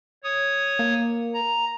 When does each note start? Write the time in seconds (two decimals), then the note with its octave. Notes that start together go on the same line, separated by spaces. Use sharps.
0.24 C#5 D#6
0.79 A#3
1.34 A#5